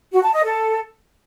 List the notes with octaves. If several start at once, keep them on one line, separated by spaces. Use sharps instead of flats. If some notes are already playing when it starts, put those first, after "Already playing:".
F#4
A5
D#5
A4